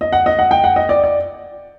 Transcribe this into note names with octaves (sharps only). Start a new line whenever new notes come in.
D#5
F#5
D#5
F#5
G5
F#5
D#5
D5
D5